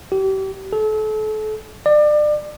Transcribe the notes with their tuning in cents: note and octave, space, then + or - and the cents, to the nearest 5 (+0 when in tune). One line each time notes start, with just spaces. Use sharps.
G4 -35
A4 -35
D5 +30